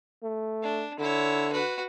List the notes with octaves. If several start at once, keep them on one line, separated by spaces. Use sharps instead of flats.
A3
D4
D3 E4 C#5
F#4 B4